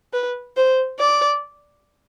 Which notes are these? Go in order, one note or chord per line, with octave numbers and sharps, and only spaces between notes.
B4
C5
D5